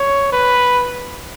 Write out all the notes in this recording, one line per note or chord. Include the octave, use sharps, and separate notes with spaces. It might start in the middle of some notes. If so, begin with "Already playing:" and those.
Already playing: C#5
B4